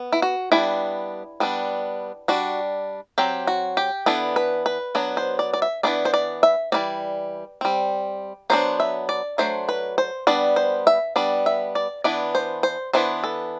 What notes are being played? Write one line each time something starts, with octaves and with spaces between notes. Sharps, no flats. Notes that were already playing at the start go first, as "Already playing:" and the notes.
Already playing: B3
E4
F#4
G3 B3 D4 E4
G3 B3 D4
G3 D4 F#4
F#3 C4 G4
F#4
G4
E3 B3 D4 A4
B4
B4
F#3 B3 D4
C5
D5
D5
E5
E3 B3 D4 D5
C5
D5
E5
E3 G3 C4 D5
G3 C4
F#3 B3 D4 C5
E5
D5
F#3 A3 D4 C5
B4
C5
G3 B3 D4 D5
C5
E5
G3 B3 D4 D5
E5
D5
E3 B3 D4 D5
C5
C5
E3 B3 D4 C5
A4